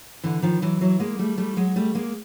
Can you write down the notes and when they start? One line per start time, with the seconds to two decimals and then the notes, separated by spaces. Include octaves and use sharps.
0.24 D3 E3
0.42 D#3 F3
0.62 E3 F#3
0.81 E3 F#3
0.99 G#3 A#3
1.19 G3 A3
1.37 G3 A3
1.57 F#3 G#3
1.76 G3 A3
1.95 G#3 A#3